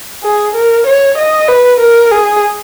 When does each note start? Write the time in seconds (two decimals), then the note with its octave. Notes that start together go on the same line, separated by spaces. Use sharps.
0.24 G#4
0.55 A#4
0.87 C#5
1.18 D#5
1.48 B4
1.80 A#4
2.11 G#4